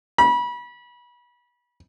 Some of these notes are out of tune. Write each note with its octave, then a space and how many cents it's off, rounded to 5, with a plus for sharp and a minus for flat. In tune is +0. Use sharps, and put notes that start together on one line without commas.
B5 -30